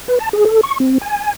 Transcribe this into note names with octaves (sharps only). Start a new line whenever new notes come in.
B4
A5
G#4
A4
C#6
C4
G#5